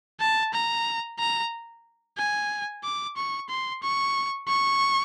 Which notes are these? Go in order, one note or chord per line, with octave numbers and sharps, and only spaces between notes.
A5
A#5
A#5
G#5
D6
C#6
C6
C#6
C#6